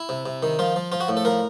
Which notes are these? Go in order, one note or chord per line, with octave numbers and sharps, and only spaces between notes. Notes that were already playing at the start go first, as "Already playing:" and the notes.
Already playing: E4
C3
C3
D#3
F3 F4
F3
F3 F4
F#4
A2
A4
F3 A#4